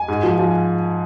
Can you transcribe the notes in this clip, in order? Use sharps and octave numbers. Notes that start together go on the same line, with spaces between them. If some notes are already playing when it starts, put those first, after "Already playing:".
Already playing: G#5
G#2
F3
F3